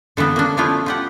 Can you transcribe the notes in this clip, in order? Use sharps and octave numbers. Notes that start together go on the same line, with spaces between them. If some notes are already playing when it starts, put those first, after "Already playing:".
D3 E3 A#3 B3
A#3 C#4 D4
F3 A3 B3 E4 F4
F4 G4 F#5